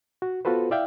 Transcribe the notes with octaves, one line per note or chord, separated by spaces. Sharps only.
F#4
B3 F4 F#4 A4 B4 C5
E4 D5 E5 F5 G5